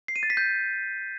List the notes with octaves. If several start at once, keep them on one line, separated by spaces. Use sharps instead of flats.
C7
D#7
A6
B6
G6